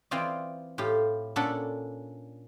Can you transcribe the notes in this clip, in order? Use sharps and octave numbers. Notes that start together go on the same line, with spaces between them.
E3 C4 F4 C5 D5 D#5
A2 F4 G4
A#2 C#4 D4 A4 F#5 B5